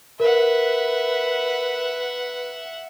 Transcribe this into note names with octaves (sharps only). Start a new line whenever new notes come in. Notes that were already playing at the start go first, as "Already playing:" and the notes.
A#4 B4 E5 F#5